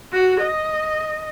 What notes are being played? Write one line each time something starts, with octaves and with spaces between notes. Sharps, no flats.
F#4
D#5